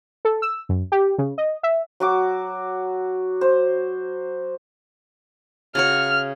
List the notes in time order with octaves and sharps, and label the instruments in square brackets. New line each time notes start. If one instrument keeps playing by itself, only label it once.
[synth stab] A4
E6
F#2
G4
C#3
D#5
E5
[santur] F#3 F#4 D6
C5
[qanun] C#3 F#4 C#5 [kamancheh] F6